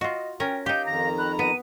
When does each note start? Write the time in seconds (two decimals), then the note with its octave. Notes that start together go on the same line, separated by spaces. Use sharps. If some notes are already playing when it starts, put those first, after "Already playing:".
0.01 F4 F#4 D#5
0.40 C#4 A#4 G5
0.66 D#4 G4 F5 G6
0.86 F2 D#3 A#5 A#6
1.18 B5 F#6
1.39 B3 D#7